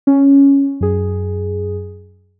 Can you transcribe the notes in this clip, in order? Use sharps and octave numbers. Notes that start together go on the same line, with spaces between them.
C#4
F#2 G#4